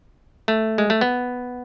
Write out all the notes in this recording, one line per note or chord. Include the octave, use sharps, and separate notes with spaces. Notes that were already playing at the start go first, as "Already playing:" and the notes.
A3
G#3
A3
B3